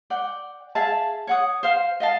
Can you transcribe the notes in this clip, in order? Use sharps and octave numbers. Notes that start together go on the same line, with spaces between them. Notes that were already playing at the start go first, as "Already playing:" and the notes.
D5 F#5 G5
G#4 E5 F5 A5
C#5 F#5 D#6
C5 F5
D#5 F5 A5